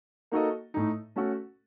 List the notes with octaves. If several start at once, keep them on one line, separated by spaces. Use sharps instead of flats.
A#3 D#4 F#4 A4 D#5
A2 A3 D#4
A3 C#4 F#4 A4